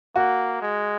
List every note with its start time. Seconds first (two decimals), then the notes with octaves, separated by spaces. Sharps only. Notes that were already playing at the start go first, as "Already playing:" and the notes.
0.16 A#3 F#4
0.62 G#3